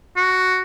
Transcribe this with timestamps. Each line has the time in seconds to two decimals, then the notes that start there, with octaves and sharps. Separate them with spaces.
0.16 F#4